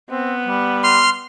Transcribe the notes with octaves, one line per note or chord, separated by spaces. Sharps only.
B3 C4
G3
C6 F6